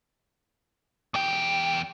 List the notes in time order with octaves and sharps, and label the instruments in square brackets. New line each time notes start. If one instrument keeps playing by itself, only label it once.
[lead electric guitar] E2 G5